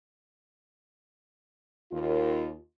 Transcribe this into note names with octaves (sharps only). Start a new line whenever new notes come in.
D#2 F4